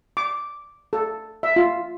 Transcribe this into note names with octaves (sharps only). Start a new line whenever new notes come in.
D6
A4
E5
F4